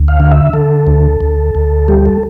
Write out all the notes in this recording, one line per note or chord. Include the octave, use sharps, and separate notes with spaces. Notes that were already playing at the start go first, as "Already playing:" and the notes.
Already playing: D2
F5
D3
E5
D3 A4
D2
D2
D2
G3 G4
A4